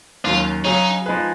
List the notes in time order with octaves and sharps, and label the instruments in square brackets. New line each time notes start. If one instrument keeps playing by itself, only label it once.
[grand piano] D#2 D#3 F#3 C#4 [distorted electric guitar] F4
[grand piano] C#3 F#3 C#4 G#4 C#5 [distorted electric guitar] D#4
[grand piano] F3 G#3 D#4 G#4 B4